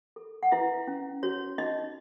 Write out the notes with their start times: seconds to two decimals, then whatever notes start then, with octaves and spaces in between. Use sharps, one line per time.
0.16 A4
0.43 F#5
0.52 E4 B4 E5
0.87 C#4
1.23 F#4 C#5
1.58 D#4 D#5